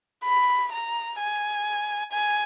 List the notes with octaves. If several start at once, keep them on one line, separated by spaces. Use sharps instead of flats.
B5
A#5
G#5
G#5